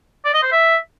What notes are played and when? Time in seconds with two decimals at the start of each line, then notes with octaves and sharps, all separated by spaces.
0.25 D5
0.34 D#5
0.43 C5
0.52 E5